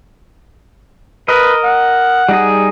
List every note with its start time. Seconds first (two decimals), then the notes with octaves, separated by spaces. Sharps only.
1.28 A#4 B4 D#5
1.64 F#5
2.29 G3 D#4 G#4